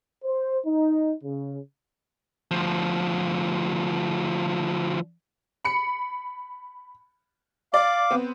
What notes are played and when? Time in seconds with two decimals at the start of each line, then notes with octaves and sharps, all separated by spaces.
0.24 C5
0.66 D#4
1.24 C#3
2.51 D2 F3
5.65 B5 C#7
7.74 D5 F5 D6
8.11 B3 C4